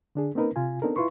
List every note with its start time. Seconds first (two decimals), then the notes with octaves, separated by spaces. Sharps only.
0.15 D3 D4 G#4
0.35 A#3 C4 C#4 D#4 A#4 B4
0.56 C3 F4 G#5
0.82 B3 C4 D4 D#4 A4 A#4
0.96 E4 F4 B4 C6 C#6